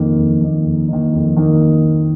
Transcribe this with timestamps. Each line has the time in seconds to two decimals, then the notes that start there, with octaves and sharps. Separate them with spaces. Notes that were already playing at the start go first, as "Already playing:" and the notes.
Already playing: F2 D#3 A#3 D#4
0.17 F2
0.41 D#3 A#3 D#4
0.64 F2
0.88 D#3 A#3 D#4
1.13 F2
1.36 D#3 A#3 D#4